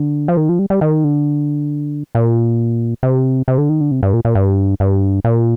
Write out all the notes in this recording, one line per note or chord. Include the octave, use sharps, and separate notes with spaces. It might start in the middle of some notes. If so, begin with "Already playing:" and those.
Already playing: D3
F3
D#3
F3
G3
G3
D#3
D3
A#2
C3
C3
D3
D#3
D3
C3
G2
A#2
A#2
G2
G2
A#2